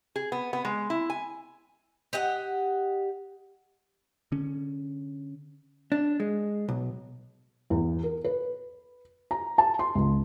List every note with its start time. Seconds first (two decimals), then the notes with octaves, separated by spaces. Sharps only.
0.16 G#4
0.32 B3
0.53 B3
0.65 G#3
0.90 E4
1.10 G#5
2.13 G4 D#5 F#5
4.32 D3 C#4
5.92 D4
6.20 G#3
6.68 B1
7.70 E2
8.03 A#4
8.24 B4
9.31 A#5
9.58 A5
9.79 C6
9.95 C#2